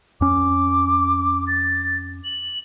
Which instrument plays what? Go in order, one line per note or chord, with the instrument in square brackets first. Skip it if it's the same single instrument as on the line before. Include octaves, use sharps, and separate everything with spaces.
[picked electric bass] F2 C#4 [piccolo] D6
[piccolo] A6
F#7